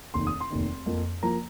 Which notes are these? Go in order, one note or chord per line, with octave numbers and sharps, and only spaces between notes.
F1 D#2 D#3 C6
D#6
C6
F1 D#2 D#3
F2 F3 A#3
F3 A#3 A#5